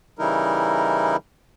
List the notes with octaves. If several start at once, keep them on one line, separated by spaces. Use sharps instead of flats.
C#3 E3 G3 D#4 E4 A#4